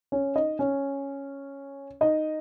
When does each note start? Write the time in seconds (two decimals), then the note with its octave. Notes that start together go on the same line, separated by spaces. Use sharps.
0.12 C#4 C#5
0.35 D#4 D#5
0.59 C#4 C#5
2.01 D#4 D#5